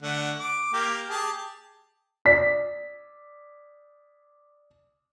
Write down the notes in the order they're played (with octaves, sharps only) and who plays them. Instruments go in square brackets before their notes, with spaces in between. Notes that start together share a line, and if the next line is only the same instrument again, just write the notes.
[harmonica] D3 A3 F#5
D6
A#3 G4
G4 G#4 A5
[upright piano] D5 B6